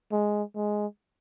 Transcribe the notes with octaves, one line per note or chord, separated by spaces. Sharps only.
G#3
G#3